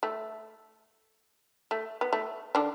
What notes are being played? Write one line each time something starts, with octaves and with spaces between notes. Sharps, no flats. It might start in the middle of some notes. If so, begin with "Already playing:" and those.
A3
A3
B3
A3
D3 D4